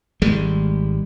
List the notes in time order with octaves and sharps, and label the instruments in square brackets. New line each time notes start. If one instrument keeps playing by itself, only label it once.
[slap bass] G#1 G3 G#3